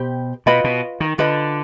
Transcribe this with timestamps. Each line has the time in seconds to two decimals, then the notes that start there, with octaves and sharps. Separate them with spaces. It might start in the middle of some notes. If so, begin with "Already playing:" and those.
Already playing: B2 G4 C5 G5 B5
0.46 B2 F4 B4 D#5 B5
0.64 B2
1.00 D#3
1.18 D3 F4 B4 D#5 B5